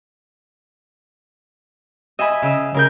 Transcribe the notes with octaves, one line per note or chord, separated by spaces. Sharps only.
D#5 E5 G#5 B5
C#3 D#5 E6
C#3 A#4 G6